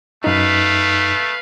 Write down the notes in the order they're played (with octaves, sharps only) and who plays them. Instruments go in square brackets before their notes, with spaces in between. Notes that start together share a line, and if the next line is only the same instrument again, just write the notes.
[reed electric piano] F#2 D#4 [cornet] A3 [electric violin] B4 F5